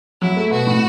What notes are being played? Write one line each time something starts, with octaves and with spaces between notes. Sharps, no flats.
F#3 E4
A3
B2 F#4
A2